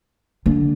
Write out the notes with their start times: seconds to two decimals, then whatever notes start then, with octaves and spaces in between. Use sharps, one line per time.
0.46 D3